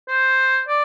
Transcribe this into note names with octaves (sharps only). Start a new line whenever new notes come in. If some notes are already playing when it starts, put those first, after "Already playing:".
C5
D5